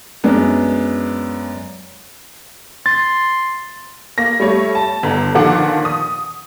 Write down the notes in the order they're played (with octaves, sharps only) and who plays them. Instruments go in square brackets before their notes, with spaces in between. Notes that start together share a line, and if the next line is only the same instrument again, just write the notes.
[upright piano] F#2 G#3 B3 D4
[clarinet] C6 [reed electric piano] A6
[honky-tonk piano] A#3 A#6
G3 A3 C#5
A5
G1 D3 A#5
A#2 D3 D#3 F3 F#5 D6
D#6